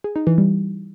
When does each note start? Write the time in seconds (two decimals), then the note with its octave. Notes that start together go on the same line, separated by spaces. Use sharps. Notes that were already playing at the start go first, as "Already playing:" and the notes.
0.04 G#4
0.16 D#4
0.27 E3
0.38 G3